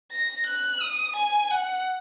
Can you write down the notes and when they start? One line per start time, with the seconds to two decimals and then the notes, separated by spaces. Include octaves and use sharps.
0.11 A#6
0.46 F#6
0.81 D#6
1.16 G#5
1.50 F#5